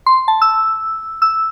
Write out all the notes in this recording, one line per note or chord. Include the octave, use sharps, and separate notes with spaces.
C6
A5
E6
E6